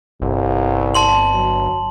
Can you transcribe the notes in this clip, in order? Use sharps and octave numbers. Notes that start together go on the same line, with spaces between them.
G1 C2
A5 C6 F#7
F#3